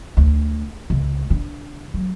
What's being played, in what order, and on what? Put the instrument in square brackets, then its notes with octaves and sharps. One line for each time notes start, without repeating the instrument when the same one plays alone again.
[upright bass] D2
C#2
D3
F#3